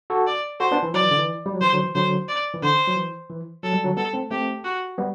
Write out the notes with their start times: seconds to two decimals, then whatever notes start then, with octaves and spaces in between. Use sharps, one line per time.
0.10 F#4 A4
0.27 D5
0.60 F#4 A4 C5
0.71 B3 D4
0.83 E3
0.94 F#3 D5
1.02 E3
1.11 D3
1.18 E3
1.46 G3
1.53 F#3
1.61 E3 C5
1.72 D3 F#3
1.84 E3
1.95 D3 F#3 C5
2.29 D5
2.54 E3
2.62 D3 C5
2.88 F#3
2.96 E3
3.30 E3
3.63 F#3 A4
3.73 G3
3.84 D3 F#3
3.97 G3 B3 A4
4.13 A3 C4
4.31 A3 C4 G4
4.64 F#4
4.98 G3 B3